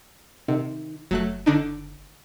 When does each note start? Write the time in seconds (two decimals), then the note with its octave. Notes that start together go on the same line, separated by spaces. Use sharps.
0.48 C3 D#3
1.11 F#1 F#3 A3 F#6
1.46 D3 D4 D#4